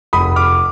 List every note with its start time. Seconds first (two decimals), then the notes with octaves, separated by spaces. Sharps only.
0.13 F1 B5 D#6
0.36 D6 F6